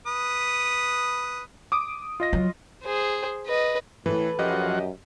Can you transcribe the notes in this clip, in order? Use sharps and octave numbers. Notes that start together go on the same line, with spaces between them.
B4 D#6
D6 D#6 D7
F4 D#5 A#6
F#3
G#4 C5
B4 D#5
A2 E3 A4 B4
F#2 F3 F#3 G4 D#5 F#5